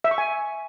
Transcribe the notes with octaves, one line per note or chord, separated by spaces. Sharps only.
E5
C#6
G#5